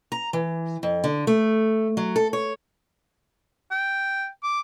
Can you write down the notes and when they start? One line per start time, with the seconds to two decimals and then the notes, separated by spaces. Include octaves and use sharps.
0.12 A#5
0.33 E3
0.83 F2
1.04 D3
1.27 A3
1.97 F#3
2.16 A4
2.33 C#5
3.71 G5
4.43 D6